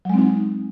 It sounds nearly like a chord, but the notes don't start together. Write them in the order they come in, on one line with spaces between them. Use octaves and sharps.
F#3 G#3 C4 D#4